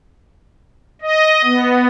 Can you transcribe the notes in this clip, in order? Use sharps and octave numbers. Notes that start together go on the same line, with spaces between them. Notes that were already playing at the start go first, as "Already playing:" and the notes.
D#5
B3